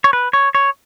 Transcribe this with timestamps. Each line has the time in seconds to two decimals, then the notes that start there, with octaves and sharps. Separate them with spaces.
0.04 C#5
0.13 B4
0.33 C#5
0.55 C#5